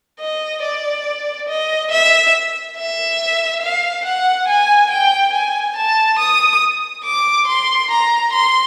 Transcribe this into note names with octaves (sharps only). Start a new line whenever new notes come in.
D#5
D5
D#5
E5
E5
F5
F#5
G#5
G5
G#5
A5
D#6
D6
C6
A#5
C6